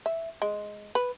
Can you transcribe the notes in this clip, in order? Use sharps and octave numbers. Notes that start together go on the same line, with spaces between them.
E5
G#3
B4